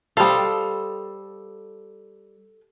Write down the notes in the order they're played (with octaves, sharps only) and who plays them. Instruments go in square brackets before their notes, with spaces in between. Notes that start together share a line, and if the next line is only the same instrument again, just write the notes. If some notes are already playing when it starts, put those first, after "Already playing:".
[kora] G3 F5 [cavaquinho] A4 C5 D#6